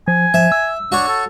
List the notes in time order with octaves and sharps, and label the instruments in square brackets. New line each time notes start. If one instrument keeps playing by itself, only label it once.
[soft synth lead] F3 [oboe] G#5
[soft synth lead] F3 [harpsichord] E5
[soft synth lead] E6
[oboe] D4 [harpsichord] F#4 C#5
[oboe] A4